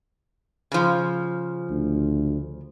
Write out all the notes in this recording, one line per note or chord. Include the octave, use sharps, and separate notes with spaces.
C#3 F3
D2